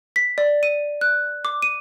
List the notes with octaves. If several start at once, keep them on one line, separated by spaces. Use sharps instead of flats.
B6
D5
D#7
F#6
D6
D#7